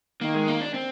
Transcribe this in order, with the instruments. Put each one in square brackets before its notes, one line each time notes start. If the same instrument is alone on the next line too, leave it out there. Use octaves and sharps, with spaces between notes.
[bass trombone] D#3 [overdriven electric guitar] A#3
[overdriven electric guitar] G#3
A#3
D4
C4